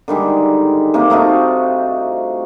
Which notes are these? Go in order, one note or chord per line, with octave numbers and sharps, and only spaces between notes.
D3 D#3 G3 G#3
C3 A#3 C4
A3 D#4 F4 F#4